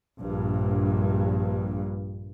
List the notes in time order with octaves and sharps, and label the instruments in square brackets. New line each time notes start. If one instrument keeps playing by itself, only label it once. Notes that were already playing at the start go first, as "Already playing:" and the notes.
[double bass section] A#1 G2